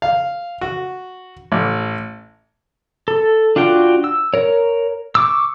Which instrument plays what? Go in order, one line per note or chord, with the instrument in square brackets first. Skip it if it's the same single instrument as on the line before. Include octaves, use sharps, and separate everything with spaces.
[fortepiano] F5
F#4
A1
[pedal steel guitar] A4
D4 F4 F#4 G5
E6
A#4 C#5
C#6 D6 E6